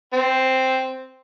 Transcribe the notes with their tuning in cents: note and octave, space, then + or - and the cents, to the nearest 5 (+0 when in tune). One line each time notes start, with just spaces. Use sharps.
C4 +0